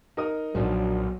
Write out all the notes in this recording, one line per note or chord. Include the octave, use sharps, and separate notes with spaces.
D#4 A#4 D#6
B1 A#2 F3 F#3 D4